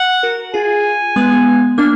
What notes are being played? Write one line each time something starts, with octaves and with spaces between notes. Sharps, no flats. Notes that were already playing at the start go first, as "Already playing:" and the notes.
Already playing: F#5
F#4 A#4
F4 G#4 G#5
G#3 B3
A#3 D4